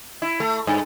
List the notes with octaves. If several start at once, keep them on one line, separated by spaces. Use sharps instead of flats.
E4
A3
G2